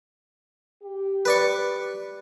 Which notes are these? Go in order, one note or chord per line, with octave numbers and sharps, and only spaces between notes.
G4
B4 D5 C#6